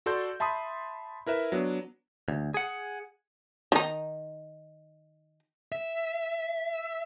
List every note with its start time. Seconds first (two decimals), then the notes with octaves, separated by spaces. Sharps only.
0.06 F#4 A4 D5 C6 G6
0.40 E5 A5 B5 C6 D#6
1.26 E4 A#4 B4 E5
1.52 F#3 B3 D4
2.28 D2
2.54 G#4 F#5
3.72 D#3 D#4
5.72 E5